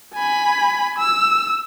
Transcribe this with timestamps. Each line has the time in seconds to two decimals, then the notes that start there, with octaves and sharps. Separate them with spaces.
0.14 G#5 B5
0.98 E6